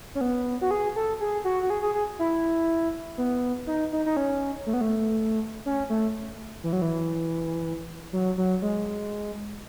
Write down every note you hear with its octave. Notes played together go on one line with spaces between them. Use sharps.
C#4
B3
F#4
G#4
A4
G#4
F#4
F#4
G#4
G#4
G#4
E4
B3
D#4
D#4
D#4
C#4
A3
B3
A3
C#4
A3
E3
F#3
E3
F#3
F#3
G#3